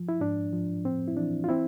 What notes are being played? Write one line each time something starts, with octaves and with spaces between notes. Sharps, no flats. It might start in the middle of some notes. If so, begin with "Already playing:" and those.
Already playing: F3
E4
G#2 D4
F3
A2 C4
E4
E3 D4
F4
C4 E4